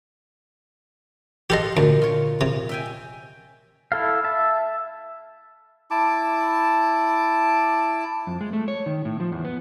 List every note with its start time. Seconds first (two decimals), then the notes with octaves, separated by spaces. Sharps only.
1.50 G4 A4 D#5 F5 F#5 C6
1.77 D2 A#2
2.02 F4 C#5
2.41 C3
2.69 E5 G5 G#5
3.92 E4 A4 F5
4.24 E5 A5
5.91 E4 A5 D6
8.27 F2
8.41 G#3
8.53 A3
8.68 C#5
8.86 D#3
9.05 A2
9.20 F3
9.32 E2
9.45 B3